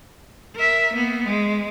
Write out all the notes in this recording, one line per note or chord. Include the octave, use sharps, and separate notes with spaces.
A#4 E5
A#3 B3
G#3